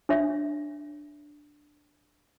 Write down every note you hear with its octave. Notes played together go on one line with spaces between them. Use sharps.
D4 C#5 E5